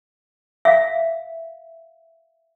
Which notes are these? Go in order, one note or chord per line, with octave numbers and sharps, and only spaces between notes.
E5 F5